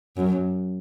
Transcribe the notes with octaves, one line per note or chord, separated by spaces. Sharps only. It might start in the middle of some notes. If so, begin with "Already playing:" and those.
F#2